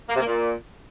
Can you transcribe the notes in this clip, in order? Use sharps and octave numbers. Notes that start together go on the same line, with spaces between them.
A#3
C3
A#3
A#2